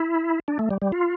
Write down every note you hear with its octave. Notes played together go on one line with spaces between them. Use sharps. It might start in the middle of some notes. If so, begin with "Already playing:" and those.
Already playing: E4
D4
A3
G3
G3
F4